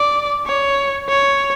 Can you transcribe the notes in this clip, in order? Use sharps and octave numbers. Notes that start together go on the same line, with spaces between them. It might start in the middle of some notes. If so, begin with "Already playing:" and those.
Already playing: D5
C#5
C#5